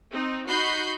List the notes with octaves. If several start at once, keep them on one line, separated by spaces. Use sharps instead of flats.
C4 D#4
D#4 F#4 B5 G6 C7